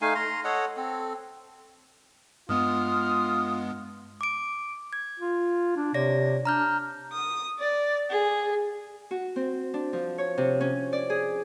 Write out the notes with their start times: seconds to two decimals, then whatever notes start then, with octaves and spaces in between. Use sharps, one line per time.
0.01 A3 D#4 F5 G#5
0.15 A#5 C6
0.44 A4 C#5 D#5 F#5
0.77 C4 A4
2.49 G2 G#3 B3 F4 D#6 F6
4.21 D6 D7
4.93 G#6
5.20 F4
5.77 D4
5.94 C3 C#5 D5 A#6
6.45 D4 A#5 F6 G6
7.13 D#6
7.58 D5
8.10 G#4
9.11 F#4
9.36 C4
9.74 D4
9.93 F3
10.18 C#5
10.38 C3
10.61 C#4
10.93 D5
11.10 G#4